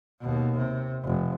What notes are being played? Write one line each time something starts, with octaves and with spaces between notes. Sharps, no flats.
D#2 B2
C3
F1